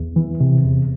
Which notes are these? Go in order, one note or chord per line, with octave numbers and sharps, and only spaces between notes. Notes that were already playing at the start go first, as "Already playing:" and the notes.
Already playing: E2
E3
C3
E2